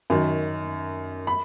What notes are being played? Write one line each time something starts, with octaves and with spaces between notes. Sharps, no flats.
F#2 D#3
B5